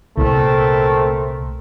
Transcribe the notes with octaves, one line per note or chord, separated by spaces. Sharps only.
C2 A#2 A3 C4 A#4